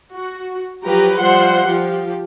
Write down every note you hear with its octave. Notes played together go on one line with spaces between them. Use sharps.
F#4
F3 F#3 G4 B4 A#5
F3 G3 C5 F#5 C6
F3 G4